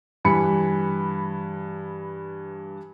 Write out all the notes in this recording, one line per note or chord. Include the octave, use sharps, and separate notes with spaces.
G2 E3 B5 C#7